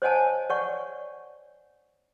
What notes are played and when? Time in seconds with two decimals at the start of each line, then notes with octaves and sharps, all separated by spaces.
0.02 C5 C#5 D#5 F#5 G#5 A5
0.50 C#5 D5 F#5 C#6